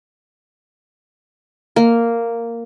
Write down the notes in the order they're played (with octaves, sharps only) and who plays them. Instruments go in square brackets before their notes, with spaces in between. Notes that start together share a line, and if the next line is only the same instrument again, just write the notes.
[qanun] A#3